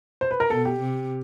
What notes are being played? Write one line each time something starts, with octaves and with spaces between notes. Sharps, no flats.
C5
B4
A#4
B2 A4
G4
C3